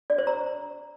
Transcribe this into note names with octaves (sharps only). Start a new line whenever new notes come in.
D5
C5
A#5